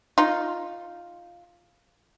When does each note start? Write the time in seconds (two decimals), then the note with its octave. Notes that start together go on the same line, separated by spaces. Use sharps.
0.18 D#4 F4